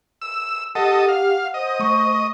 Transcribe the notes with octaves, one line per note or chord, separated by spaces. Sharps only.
E6
G4 A4 D#5 F#5
F5
C5 D#5
A3 C#6